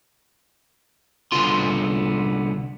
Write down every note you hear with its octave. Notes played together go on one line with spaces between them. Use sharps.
C2 D3 B3 F4 C6